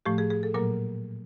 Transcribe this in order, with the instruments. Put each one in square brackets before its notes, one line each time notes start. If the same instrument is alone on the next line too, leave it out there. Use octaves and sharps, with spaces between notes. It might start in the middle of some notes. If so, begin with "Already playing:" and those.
[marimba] A2 F3 A3 G4
G#4
G#4
A4
A#2 F#3 A#3 A#4